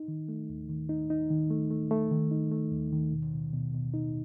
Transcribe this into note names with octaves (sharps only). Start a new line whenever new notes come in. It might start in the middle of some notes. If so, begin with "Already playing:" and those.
Already playing: D#4
D#3
A3
D#2
D#3
D#4
D#4
D#3
A3
A3
A3
D#3
D#4
A3
D#2
D#3
B2
B2
B2
B2
D#4